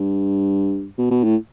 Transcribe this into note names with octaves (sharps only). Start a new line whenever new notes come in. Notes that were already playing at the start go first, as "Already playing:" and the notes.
Already playing: G2
B2
B2
A2